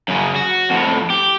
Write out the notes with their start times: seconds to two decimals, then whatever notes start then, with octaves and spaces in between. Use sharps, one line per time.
0.08 F#2 C#3
0.36 F#4
0.70 F2 A2
1.10 G4